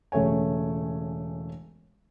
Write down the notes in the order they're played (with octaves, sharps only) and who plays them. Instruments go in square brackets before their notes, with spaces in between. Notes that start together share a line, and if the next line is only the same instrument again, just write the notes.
[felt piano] E1 C#3 A3 C#5 G#5